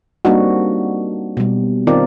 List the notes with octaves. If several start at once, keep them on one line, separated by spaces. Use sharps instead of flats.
G3 A#3 C4 D4 D#4 F#4
B2 G3
D#3 C4 D#4 F4 A#4 D5